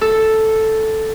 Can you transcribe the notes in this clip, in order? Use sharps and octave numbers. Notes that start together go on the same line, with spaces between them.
A4